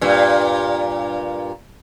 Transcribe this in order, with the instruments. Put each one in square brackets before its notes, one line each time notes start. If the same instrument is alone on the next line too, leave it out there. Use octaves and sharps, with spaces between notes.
[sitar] G2 A#2